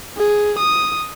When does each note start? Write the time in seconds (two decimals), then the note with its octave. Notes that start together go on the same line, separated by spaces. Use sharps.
0.17 G#4
0.58 D#6